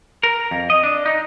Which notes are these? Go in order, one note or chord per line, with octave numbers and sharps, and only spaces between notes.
A#4
F2
D#5
D4
D#4